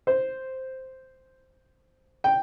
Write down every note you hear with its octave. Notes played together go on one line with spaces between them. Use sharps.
C5
G5